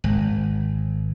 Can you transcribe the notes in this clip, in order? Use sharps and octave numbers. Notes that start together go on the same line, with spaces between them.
G#1